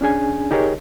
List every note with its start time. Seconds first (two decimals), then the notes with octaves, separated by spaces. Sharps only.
0.01 C#4 D4 G#4 G#5
0.51 D#4 G4 G#4 A#4 C#5 D#5